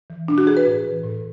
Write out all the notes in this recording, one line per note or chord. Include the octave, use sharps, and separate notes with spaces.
E3
B2 D4
F#4
G#4
B4
A2
E3
A2